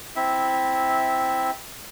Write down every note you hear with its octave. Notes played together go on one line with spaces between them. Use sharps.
C4 E4 E5